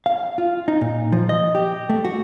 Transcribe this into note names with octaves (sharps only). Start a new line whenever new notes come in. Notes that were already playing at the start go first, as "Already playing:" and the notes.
F5
F4
D#4
A#2
F3
D#5
G4
A3
F#4